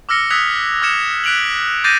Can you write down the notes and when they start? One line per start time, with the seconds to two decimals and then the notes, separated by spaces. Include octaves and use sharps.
0.09 D6 E6 F6 A#6 C#7 G7
0.31 D#6 E6 F#6 G#6 B6 F7
0.82 D6 F6 G#6 C#7 E7
1.24 F#6 B6 D7 F7 F#7
1.84 D6 G6 A6 A#6 C7 D#7